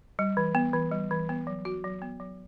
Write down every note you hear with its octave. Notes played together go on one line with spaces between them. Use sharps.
G3
E3
B3
E3
G3
E3
B3
F#3
F#4
F#3
B3
F#3